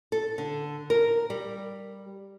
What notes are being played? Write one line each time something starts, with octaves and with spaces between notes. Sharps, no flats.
A4
D3
A#4
G3